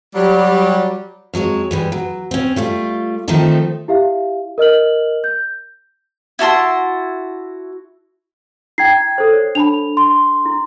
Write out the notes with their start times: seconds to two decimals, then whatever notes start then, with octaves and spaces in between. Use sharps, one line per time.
0.14 F#3 G3
1.34 F2 F#3 G#3 C#5
1.71 E3 G3 G#3
1.92 F#3
2.31 C4 C#4
2.56 G3 A3 F4
3.28 D#3 F3 A3 C4 D#4 A4
3.88 E4 G4 E5 F5
4.58 A#4 D#5 F6 F#7
5.24 G6
6.39 E4 F#4 A5 C6
8.78 E4 G5 G#6 C7
9.18 A4 C5
9.33 C#5
9.55 D4 A5 B5 F7
9.97 C6
10.46 E4